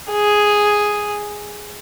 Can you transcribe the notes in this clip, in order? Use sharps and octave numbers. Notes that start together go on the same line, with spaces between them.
G#4